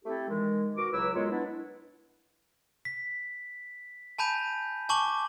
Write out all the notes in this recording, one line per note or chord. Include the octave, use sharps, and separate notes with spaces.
A3 C4 E4 G4 A4
D#3 E3 G#3
B2 F#4 A#4 D6
C#2 F#3 E4 B4 E6
F#2 G#3 B3 F4 C#5
B3 D4 E4
B6
G#5 A5 B5 G6 D#7
G#5 A5 C#6 D6 F#7